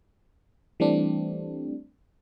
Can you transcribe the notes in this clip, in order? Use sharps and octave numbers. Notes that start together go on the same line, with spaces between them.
E3 G3 A3 C4 D4